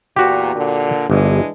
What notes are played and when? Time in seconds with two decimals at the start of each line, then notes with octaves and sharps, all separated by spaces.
0.16 E2 A#2 F#4 G4
0.56 A#2 D3
1.10 G1 E3 G#3 D4